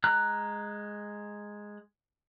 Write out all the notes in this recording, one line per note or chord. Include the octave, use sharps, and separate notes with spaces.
G#3 A#5 F6 F#6